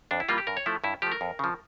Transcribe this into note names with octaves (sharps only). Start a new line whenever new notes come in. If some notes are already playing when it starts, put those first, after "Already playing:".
F2 D4
E4
E3 G3 A#3 F4
G4
G2 A#4
C#5
F3 A3 E4
G2 E4
F3 A3 G4
A#4
F2
C#3 F3